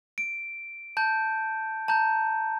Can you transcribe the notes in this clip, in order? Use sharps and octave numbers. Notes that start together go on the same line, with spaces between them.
D7
A5 G6
A5 A#5 G6